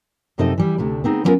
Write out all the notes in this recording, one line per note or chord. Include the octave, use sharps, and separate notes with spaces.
F#2 C3 C4 D#4 A4 D#5
E3 G3
D2 C3 A3 D4
B3 C4 D#4 G#4
F#3 G3 B3 C#4 F4 A#4